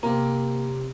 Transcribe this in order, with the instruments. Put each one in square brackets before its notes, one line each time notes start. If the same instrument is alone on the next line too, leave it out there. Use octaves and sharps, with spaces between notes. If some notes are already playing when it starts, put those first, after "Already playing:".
[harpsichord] C3 [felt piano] A#3 [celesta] A#5